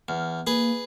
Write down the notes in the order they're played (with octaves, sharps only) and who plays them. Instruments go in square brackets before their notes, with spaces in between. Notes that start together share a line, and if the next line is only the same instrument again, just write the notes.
[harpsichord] E2 [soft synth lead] F6
[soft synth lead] A#3 [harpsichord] G#4 B4